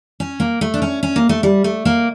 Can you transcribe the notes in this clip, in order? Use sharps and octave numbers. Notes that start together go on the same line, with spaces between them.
C#4
A#3
A3
D4
C#4
C#4
A#3
A3
G3
A3
A#3